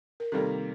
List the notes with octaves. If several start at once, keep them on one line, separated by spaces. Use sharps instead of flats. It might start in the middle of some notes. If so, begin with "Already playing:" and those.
A#4
C3 D#3 G3 A#3 A4